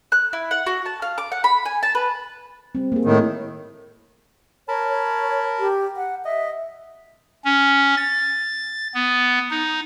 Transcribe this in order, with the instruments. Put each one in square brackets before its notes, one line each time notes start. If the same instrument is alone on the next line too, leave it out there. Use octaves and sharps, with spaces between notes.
[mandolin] F#6
E4
F#5
F#4
A5
F5
D6
F#5
B5
G#5
A5
B4
[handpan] G3 C4
A#3 G#4
[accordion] A2 D#3
[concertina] A#4 A5 B5 [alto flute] C#5
[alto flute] C#5
G4
F#5
[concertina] D#5 [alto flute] E5
[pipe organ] C#4
A6
B3
D#4